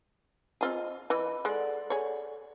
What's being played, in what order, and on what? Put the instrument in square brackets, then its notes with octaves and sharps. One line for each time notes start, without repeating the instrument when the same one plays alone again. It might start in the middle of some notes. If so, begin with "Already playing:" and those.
[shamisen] C4 F4 G#4 [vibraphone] D#5
[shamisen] E3 [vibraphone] D#5 B5
[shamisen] G#3 [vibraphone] A4 D5 F#5
[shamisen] G#4 C#5